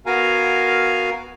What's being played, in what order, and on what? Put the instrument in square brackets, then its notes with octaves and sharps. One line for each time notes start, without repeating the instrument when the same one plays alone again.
[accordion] B3 F#4 A#4 F5 G#5 A#5